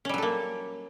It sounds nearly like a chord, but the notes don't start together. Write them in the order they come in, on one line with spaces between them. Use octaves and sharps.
C#4 G3 F#3 A4 A#3